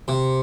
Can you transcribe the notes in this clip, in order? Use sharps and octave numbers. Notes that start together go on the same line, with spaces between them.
C3